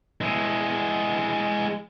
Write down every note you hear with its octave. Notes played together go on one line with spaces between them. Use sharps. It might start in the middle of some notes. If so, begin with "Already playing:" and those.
E3 G#3